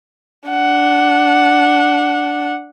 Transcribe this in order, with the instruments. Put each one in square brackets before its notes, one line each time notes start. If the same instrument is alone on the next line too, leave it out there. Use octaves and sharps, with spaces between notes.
[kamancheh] D4 F#5